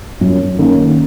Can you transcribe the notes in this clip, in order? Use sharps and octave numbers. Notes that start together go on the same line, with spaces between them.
F#2
D#3 A#3 C#4